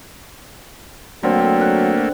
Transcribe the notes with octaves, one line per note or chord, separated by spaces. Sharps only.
D3 F#3 A3 A#3 C4
F#5